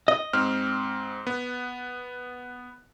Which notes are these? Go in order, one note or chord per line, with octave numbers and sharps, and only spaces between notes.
D#5
G#2 C4 F6
B3